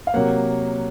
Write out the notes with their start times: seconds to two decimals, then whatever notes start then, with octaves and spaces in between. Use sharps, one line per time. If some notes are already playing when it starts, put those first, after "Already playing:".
0.07 F5
0.14 C3 F#3 A#3 F#5